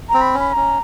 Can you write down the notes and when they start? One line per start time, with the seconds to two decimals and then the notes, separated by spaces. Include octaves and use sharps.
0.09 A#5
0.14 C4
0.21 B5
0.34 C#4 B5
0.49 B5
0.52 C#4 A#5